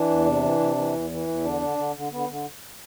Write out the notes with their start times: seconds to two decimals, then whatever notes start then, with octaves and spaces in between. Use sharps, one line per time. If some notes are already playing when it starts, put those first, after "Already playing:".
Already playing: E3 D4
0.09 E2
0.25 C3
0.43 E3
0.59 C3
0.76 E3
0.93 E2
1.10 E3
1.27 E2
1.44 D3 D4
1.61 D3
1.77 D3
1.95 D3
2.12 D3 B3
2.29 D3